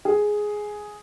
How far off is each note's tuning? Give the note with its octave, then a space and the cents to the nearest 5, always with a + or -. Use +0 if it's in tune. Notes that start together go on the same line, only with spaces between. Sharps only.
G#4 +5